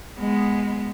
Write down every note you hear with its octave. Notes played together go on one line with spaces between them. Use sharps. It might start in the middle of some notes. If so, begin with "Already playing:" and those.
G#3 B3